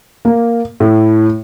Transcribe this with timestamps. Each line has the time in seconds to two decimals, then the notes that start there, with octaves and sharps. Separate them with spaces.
0.25 A#3
0.80 A2